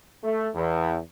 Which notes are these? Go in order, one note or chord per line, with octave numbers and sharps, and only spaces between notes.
A3
E2